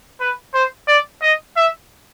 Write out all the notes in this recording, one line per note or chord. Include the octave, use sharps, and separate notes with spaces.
B4
C5
D5
D#5
E5